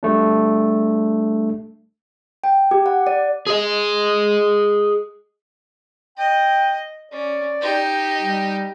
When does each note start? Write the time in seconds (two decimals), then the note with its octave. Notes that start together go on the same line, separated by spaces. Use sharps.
0.03 G3 A3 D4
2.44 G5
2.71 G4
2.86 F#5
3.07 D5
3.47 G#4 D#5
6.18 D#5 G5
7.12 C#4 D5
7.61 D#4 G4
8.17 G3